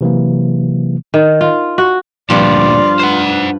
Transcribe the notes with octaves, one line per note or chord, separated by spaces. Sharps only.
C3 E3 F#3 A#3
D#3
F4
F#4
D2 G2 A#2 F3 G3 F4 D5
B4 C5 F#5